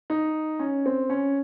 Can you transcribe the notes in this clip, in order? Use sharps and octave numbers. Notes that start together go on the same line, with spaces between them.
D#4
C#4
C4
C#4